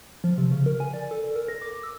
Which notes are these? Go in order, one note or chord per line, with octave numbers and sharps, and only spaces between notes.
F3
C3
C#3
A#4
G#5
D5
A4
A#4
A#6
D6
E6